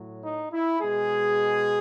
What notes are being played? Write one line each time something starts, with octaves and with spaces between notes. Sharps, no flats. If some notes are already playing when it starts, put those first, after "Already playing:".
Already playing: A2 F#3
D#4
E4
B2 G#3 G#4